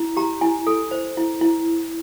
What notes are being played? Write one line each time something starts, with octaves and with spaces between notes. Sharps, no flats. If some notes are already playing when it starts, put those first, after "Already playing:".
Already playing: E4
G4 A#5
E4 G#5
A4
C5
E4
E4